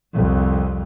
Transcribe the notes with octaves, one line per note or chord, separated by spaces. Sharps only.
C2 F2